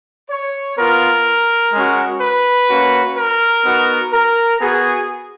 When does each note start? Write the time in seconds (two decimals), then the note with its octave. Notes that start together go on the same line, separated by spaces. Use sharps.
0.30 C#5
0.77 B3 F4 A#4
1.72 G#3 C#4 F#4
2.20 B4
2.68 A#3 C#4 F#4
3.16 A#4
3.64 B3 D#4 F#4
4.12 A#4
4.60 B3 F#4 G#4